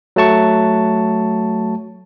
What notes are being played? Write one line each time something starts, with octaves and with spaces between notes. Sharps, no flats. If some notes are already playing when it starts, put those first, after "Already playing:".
F#3 A3 A5 C#6